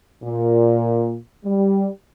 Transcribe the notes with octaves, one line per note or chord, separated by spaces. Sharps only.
A#2
G3